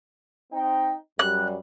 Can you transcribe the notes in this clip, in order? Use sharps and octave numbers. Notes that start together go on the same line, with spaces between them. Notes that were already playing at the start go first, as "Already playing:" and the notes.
C4 D#4 G5
F#2 G3 F#6